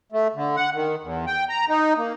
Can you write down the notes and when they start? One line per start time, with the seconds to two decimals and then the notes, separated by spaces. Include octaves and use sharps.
0.12 A3
0.35 D3
0.56 F#5
0.74 D#3
1.03 E2
1.27 G5
1.49 A#5
1.69 D#4
1.97 A#3